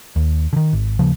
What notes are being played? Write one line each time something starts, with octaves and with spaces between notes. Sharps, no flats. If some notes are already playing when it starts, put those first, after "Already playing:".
D#2
D3 D#3
G#1
D#2 C#3 F3